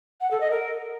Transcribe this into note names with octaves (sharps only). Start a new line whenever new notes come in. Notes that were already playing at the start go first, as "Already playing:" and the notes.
F#5
A4
D#5
A#4